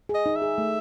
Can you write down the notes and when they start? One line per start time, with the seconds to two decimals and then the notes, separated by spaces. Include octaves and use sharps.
0.09 G#4 D#5
0.26 D#4
0.36 E5
0.42 G#4
0.58 A3